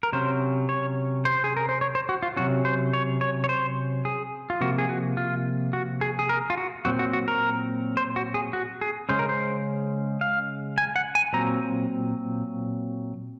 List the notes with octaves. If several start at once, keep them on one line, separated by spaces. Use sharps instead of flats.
A#4
C3 F#3 C#4 C5
C#5
C5
G#4
A#4
C5
C#5
C5
F#4
F4
C3 F#3 C#4 F#4
C5
C#5
C#5
C#5
C5
G#4
F4
C3 F3 A#3 F#4
G#4
F#4
F4
F#4
G#4
G#4
A#4
F4
F#4
A#2 F#3 C4 F#4
F#4
F#4
A#4
C5
F#4
G#4
F#4
G#4
C#3 G#3 C#4 C5
A#4
C5
F5
G#5
F#5
G#5
A#2 F#3 C4 A#5